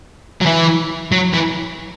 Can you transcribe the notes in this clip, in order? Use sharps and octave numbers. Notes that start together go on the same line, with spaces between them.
F#3
E3
F#3
E3